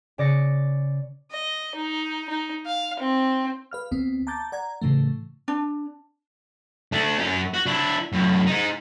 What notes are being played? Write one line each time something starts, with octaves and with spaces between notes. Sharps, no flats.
C#3 D5 A#6 C#7
D#5
D#4
D#4
F5
C4
B4 F5 F6
D2 B3 C4
A5 A#5 D6 G6 A6
D5 F#5 A#5 G#6
A2 C#3 E3 A3
D4
A3 D4
F#2 C#4
F#4
D4 E4
F#2 A2
G#3 D#4